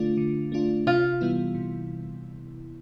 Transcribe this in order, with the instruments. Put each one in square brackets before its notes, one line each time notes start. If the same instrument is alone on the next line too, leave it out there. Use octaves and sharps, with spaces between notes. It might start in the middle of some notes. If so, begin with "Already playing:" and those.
Already playing: [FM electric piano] D3 A3 D4 F4
D3
A3 D4 F4
[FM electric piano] C3 [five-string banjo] F4
[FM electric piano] E3 G3 B3 E4
C3